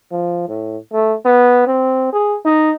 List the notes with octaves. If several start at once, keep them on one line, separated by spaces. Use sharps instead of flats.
F3
A2
A3
B3
C4
G#4
D#4